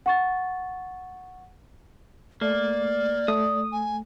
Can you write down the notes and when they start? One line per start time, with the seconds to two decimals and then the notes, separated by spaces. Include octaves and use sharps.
0.06 F#5 C#6 A6
2.41 A3 A#3 D5
3.28 A3 D#6
3.72 G#5